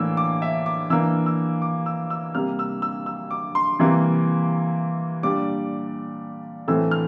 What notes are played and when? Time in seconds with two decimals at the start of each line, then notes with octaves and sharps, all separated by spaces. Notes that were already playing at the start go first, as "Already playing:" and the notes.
Already playing: A2 E3 A#3 D4 E6
0.17 D6
0.42 E5
0.66 D6
0.90 E3 A#3 D4 E6
1.26 E6
1.62 D6
1.86 E6
2.10 E6
2.35 C3 G3 A#3 F6
2.59 E6
2.82 E6
3.06 E6
3.31 D6
3.55 C6
3.79 C3 E3 G3 A#3
5.23 A#2 G3 D4 D6
6.68 A2 E3 A3 C4 E6
6.91 F6